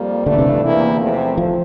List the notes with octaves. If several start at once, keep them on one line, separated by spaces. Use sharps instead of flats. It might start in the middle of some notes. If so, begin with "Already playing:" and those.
Already playing: F2 G3 A#3
G2 D3 E3 A3 D4
C3
E2 C3 E3 A#3 E4
E2 C3 F3 A3 C4
F3